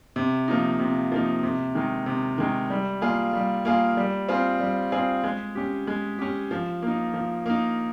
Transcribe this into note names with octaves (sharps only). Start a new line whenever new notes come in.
C3
F3 A#3 D#4
C3
F3 A#3 D#4
C3
D#3 G#3 D#4
C3
D#3 G#3 D#4
G3
A#3 F4 G#4
G3
A#3 F4 G#4
G3
C4 F4 G#4
G3
C4 F4 G#4
G#3
C#4 G4
G#3
C#4 G4
F3
A#3 D#4
F3
A#3 D#4